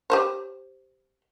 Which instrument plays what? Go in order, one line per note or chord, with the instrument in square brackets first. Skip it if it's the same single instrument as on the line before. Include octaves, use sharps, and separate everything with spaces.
[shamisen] G4 C5 C#5